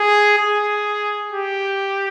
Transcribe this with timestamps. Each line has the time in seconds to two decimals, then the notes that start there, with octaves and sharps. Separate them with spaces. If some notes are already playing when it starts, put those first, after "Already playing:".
Already playing: G#4
0.38 G#4
1.32 G4